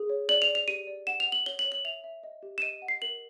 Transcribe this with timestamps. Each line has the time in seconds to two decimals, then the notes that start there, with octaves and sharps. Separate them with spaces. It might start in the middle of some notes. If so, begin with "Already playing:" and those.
Already playing: G#4
0.10 C#5
0.29 D5 F#7
0.42 F7
0.48 D5
0.55 F7
0.68 G4 D#7
0.87 D5
1.07 F#5 E7
1.20 F7
1.27 F#5
1.32 F#7
1.46 C#5 G7
1.59 F#7
1.65 C#5
1.72 F#7
1.85 E5 F7
2.04 E5
2.23 D#5
2.43 G4
2.58 E7
2.62 D#5 D#7
2.82 F#5
2.88 C7
3.02 A#4 F#7